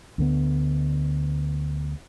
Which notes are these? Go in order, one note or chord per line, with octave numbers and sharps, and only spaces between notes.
D2 D3 B3